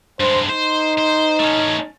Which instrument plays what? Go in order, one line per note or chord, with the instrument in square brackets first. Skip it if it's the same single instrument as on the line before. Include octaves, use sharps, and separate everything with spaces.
[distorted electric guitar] G2 G#3 [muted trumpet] C5
[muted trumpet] D#4 [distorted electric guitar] C5
[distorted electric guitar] C5
A3 C#4